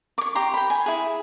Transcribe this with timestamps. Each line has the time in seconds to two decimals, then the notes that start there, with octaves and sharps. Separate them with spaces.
0.18 C#6 D6
0.35 G4 A#5 C6
0.54 G5 B5
0.70 G#5
0.86 E4 G#4